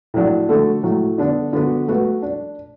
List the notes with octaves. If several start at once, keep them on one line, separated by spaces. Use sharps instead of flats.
A2 F#3 D4
D3 A3 F#4 A4
A2 F#3 A3
D3 B3 D4 A4
D3 B3 F#4 B4
A3 F#4 B4
D4